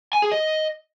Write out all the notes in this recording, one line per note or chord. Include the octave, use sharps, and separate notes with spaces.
G#5
G#4
D#5